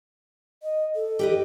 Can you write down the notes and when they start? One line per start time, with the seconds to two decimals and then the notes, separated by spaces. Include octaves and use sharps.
0.63 D#5
0.95 A4
1.19 G4 B4 D#5